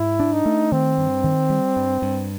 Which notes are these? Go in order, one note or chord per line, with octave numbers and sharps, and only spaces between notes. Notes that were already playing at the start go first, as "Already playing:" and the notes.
Already playing: G#2 E4
D4
D#4
A3
D#3 C4
G2
D#3
G3
G2
G2